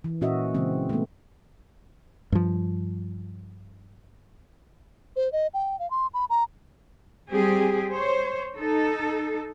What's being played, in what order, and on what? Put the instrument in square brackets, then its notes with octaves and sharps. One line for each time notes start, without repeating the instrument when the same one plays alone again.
[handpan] E3
A#2 C#4 F#4 D#5 E5
C#3 E3 G#3 C4
A3 B3
[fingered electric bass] G2 F3
[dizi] C5
D#5
G5
F5
C6
B5
A#5
[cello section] G3 C4 G4 G#4
C5 C#5
D#4 A4